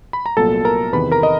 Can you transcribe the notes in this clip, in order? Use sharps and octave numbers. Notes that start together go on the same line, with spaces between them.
B5
A#5
C2 A#2 F#3 B3 A4 A5
A#4 A#5
E2 C3 D#3 B4 B5
A#4 A#5
D#5